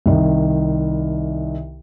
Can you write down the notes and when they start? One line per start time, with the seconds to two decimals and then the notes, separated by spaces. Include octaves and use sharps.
0.06 C2 D#3